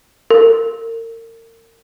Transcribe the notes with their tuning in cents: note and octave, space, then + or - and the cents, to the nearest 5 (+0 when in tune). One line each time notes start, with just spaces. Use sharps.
A#4 -35